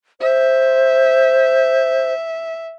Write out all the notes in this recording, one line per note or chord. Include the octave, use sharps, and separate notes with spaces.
C5 E5